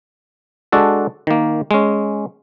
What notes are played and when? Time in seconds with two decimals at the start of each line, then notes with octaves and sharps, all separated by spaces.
0.72 G#3 D4 F#4 A4
1.27 D#3 A#3
1.71 G#3 C#4